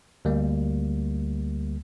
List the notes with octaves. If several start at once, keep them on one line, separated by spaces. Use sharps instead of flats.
D2 G3 A#3